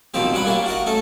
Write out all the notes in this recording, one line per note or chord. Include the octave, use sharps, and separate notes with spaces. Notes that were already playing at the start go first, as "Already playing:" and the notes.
B2 D#3 F3 A#3 C4 G4
G2 C#4 F#5 B5
G3 A#3 C#4 D4 E4
F#4 A#4 D#5
A3 C#4 A4